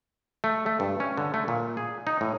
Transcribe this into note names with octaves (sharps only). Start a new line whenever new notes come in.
A3
A3
G2
C#4
D3
A3
A#2
G#4
D#4
A2